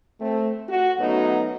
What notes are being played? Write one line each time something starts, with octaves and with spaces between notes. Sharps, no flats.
A3 C4
F#4
F#2 F#3 A3 B3 D#4